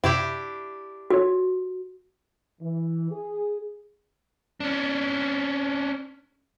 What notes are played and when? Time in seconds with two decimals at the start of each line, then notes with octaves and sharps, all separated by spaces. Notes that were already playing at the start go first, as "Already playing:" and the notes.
0.04 F#2 C3 D4 E4 G4
1.10 F4 F#4 A4 C#5
2.61 E3
3.11 G#4
4.60 C#4 D4